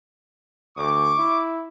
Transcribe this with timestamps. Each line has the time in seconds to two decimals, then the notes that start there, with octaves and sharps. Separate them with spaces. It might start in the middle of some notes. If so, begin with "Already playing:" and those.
0.77 D2 C#6 D6
1.18 E4